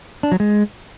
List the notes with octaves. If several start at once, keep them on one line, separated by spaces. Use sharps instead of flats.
D4
F#3
G#3